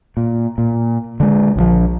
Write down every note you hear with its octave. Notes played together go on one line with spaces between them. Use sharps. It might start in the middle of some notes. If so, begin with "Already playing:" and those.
A#2
A#2
D3 G#3
A#1 D#3 F3